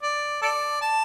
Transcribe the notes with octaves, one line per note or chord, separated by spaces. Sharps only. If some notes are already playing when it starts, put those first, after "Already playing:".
D5
A4 D5
A5